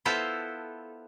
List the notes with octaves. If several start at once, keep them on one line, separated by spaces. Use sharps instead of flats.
B3 E4 F4 A4 C5